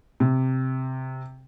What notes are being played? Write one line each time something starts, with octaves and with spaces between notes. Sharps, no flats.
C3